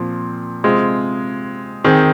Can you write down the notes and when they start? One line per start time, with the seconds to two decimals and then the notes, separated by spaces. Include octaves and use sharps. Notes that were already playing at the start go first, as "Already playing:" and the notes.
Already playing: A#2 F3 C4
0.64 C3 G#3 C4 F4 G#4
1.84 D#3 C4 G#4